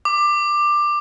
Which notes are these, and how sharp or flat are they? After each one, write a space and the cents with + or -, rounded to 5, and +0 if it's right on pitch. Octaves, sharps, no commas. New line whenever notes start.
D6 +15